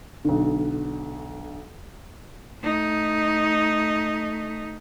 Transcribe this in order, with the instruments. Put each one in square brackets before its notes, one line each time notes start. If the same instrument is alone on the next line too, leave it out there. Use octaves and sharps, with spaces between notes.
[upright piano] B1 D3
[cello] A3 D#4